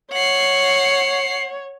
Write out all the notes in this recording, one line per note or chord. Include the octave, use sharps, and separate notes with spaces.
C#5 F#5 C7